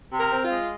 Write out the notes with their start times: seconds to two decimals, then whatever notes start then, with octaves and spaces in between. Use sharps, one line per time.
0.13 C3
0.19 A#4
0.31 C4
0.44 F4
0.51 G#3